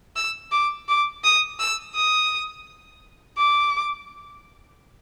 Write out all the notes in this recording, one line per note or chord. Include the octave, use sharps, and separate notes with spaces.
E6
D6
D6
D#6
E6
D#6
D6